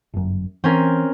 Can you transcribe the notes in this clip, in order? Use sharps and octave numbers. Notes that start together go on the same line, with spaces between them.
G1 F#2
E3 C4 C#4 A#4